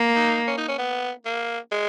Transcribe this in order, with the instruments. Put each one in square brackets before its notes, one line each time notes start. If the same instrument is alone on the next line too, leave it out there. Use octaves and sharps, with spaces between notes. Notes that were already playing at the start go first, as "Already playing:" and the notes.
Already playing: [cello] A#3
[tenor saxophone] D#4
C#4
D#4
C#4
B3
A#3
G#3